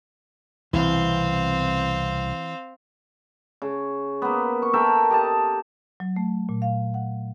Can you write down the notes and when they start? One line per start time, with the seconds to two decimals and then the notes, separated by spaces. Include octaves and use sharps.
0.73 C2 B2 E3 C4 F5
3.62 C#3
4.22 A#3 B3
4.62 C#6
4.73 A4 A#4 E5 G5
5.10 G4 D#5 A5
6.00 F#3
6.16 A3
6.49 A#2
6.62 F5
6.94 F#5